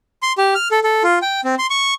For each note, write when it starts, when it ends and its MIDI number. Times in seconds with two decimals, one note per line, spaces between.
0.22 0.33 84
0.38 0.54 67
0.55 0.68 89
0.71 0.80 69
0.84 1.03 69
1.03 1.19 65
1.22 1.41 79
1.44 1.55 60
1.59 1.67 84
1.70 1.94 85